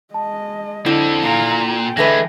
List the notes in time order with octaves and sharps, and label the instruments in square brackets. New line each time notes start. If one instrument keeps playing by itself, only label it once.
[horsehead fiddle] G#3 D#5 [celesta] A5
[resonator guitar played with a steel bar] D3 [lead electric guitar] C4 A4 [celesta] E4
[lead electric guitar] A#2 [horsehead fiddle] F5 A#5
[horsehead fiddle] G5
[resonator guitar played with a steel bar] D3 A3 B4 [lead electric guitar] E3 G#3 [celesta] A#6